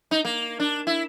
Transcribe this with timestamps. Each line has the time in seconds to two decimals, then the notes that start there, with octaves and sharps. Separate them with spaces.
0.11 D#4
0.25 A#3
0.60 D4
0.87 E4